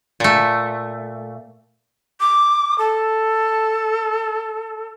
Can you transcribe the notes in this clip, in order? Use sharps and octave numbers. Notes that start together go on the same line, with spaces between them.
A#2 A3
D6
A4